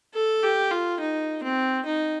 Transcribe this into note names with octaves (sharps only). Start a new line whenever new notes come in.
A4
G4
F4
D#4
C4
D#4